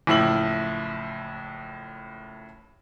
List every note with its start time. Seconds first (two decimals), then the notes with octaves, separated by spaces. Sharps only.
0.07 F#1 A2 F3 E4 E6 F#7